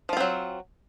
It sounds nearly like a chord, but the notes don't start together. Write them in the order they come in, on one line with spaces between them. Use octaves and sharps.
F3 F4 C4 F#3